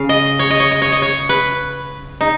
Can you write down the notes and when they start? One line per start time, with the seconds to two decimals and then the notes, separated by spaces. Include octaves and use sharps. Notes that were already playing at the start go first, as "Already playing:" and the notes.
Already playing: C#3 F5
0.09 D#5
0.39 C#5
0.50 D#5
0.60 C#5
0.72 D#5
0.82 C#5
0.92 D#5
1.02 C#5
1.29 B4
2.21 D#4